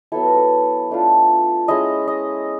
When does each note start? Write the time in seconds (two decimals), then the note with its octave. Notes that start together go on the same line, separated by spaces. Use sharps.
0.12 F#3 B3 E4 A4
0.25 A#4
0.36 A4
0.91 A3 D4 F4
1.68 G#3 C#4 E4 D#5
2.08 D#5